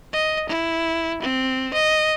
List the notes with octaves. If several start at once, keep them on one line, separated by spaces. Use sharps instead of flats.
D#5
E4
C4
D#5